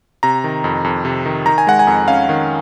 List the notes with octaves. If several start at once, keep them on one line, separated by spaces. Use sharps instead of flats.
C3 A#5
D#3
F2
F2
C3
D#3
D#3 A#5
G#5
G#3 F#5
G#5
F2
C#4 F5
D#3